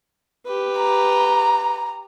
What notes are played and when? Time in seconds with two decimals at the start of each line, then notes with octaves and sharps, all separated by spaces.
0.46 G4 B4
0.78 A#5